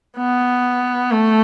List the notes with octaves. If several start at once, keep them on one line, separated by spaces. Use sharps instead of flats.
B3
A3